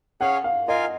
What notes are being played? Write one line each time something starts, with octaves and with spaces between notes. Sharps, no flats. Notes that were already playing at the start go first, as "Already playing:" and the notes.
C#4 G#4 C#5 F5 F#5 G#5
F5
F4 A#4 D#5 F5 G#5